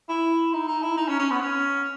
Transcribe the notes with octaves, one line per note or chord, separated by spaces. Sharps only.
E4
D#4
D#4
E4
D#4
C#4
C#4
B3
C#4